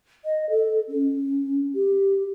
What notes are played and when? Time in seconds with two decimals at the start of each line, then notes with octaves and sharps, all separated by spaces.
0.25 D#5
0.50 A4
0.88 C#4
1.75 G4